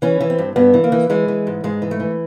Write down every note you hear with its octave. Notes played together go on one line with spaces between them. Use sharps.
E3 C#4
E3
C4
G2
G2 B3
E3
A#3
E3
E3 G#3
E3
G#2
G#2 G#3
E3
A3
E3